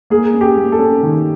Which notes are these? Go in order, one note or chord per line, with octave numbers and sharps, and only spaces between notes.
A#3 G#4
C#4
G4
A#3
A4
C#4
D#3